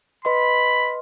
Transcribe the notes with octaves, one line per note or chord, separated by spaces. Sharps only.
B4 D#5 B5 C6